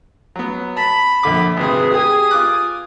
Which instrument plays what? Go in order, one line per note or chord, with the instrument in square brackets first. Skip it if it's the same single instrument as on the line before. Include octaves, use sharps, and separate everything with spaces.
[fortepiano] F#3 B3
[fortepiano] A5 [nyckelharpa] B5
[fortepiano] A#1 D3 D6
[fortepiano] G#1 C3 [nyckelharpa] G#4 B4
[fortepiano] G4 G#4 [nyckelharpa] G#5 D#6
[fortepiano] F4 D6 F#6